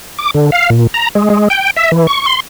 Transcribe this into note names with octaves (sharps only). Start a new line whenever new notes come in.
D6
D3
F5
A#2
A#5
G#3
G#3
G5
E5
E3
C#6
C6